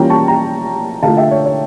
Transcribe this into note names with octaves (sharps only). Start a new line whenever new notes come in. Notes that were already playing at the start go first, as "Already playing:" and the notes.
Already playing: E3 G3 A#3 C#4 F4 G5 A#5
A5 C#6
G5 A#5
D3 A3 D4 F4 F5 A5
E5 G5
C#5
C#5